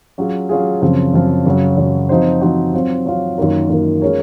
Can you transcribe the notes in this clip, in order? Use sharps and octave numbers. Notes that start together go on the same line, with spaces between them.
F#3 C#4 F4 G#4
F#3 C#4 F4 G#4
F#2 C#3 F3 C4 F4
F#2 C#3 F3 C4 F4
F#2 C#3 F#3
F#2 C#3 F#3
F3 C4 D#4 F#4 C5
F3 C4 D#4 F#4 C5
F#3 C4 F4
F#3 C4 F4
F#2 D#3 A#3 F4 A#4
F#2 D#3 A#3 F4 A#4
G#3 C#4 F4 A#4 C#5